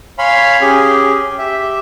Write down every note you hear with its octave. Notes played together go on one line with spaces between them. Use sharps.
C#5 F5 G#5 B5 C6
C#4 G4 G#4
G4 E5